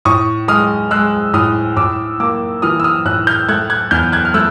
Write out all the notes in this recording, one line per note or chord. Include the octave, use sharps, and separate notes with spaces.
A2 C#6 D#6
G#3 D#6 F6
G#3 E6 F#6
A2 D#6 F6
A2 D6 E6
A#3 D6 E6
E3 D#6 F6
E6
D#6 F6
A2 E6 F#6
F6 G6
A3 F#6 G#6
F#6 G#6
E2 F6 G6
F#6 G#6
F6
A3 E6 F#6